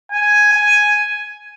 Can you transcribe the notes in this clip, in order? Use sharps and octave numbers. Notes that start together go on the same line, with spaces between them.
G#5
G#5